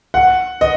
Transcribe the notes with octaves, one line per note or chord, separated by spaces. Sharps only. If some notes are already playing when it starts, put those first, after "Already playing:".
F#5
D#5